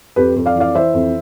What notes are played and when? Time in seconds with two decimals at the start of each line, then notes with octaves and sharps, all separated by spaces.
0.16 F2 G4 B4
0.36 F2
0.46 D5 F5
0.55 E3
0.60 D5 F5
0.75 E3 C5 E5
0.94 F2